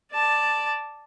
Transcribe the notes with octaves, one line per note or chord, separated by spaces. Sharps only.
D5 A5